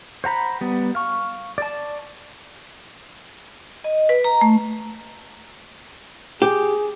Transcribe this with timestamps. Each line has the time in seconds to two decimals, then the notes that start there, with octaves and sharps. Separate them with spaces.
0.24 C5 F#5 A#5 B5
0.61 G3 B3
0.95 F5 C#6
1.58 D5 A5
3.84 D#5
4.09 B4
4.24 A#5
4.41 A3
6.42 G4 G#4